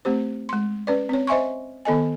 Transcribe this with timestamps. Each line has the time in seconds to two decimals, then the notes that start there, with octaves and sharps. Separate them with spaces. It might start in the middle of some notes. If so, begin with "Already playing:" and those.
0.05 A3 C4 G4 C5
0.49 G#3 C6
0.87 C#4 B4 D5
1.09 C4 C#5
1.27 C5 D#5 E5 G#5 C6 C#6
1.85 D#3 B3 A4 D#5 G#5